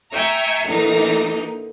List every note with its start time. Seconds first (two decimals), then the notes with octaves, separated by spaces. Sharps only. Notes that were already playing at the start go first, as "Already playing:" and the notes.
0.13 E5 G5 G#5 A#5 C#6 E6
0.64 A#2 D3 E3 D#4